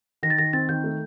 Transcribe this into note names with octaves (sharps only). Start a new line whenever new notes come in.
D#3 A#6
A6
D#3 A#6
C4 A6
D#3 G6
A3